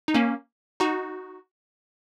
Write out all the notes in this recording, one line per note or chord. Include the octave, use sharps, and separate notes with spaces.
D#4
A#3 C#4
D#4 F#4